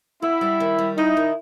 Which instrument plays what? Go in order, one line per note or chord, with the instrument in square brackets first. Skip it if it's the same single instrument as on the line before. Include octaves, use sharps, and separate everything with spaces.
[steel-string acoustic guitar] B3 [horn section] E4
[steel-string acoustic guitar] G3
D#3
G3
[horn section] D#4 [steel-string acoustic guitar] E4
[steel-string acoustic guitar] D#3